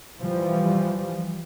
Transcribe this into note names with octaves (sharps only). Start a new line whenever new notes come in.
E3 F3 G3